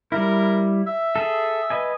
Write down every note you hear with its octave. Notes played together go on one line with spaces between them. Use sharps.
G3 E4 A#4
E5
G#4 A4
B4 D#5 G#5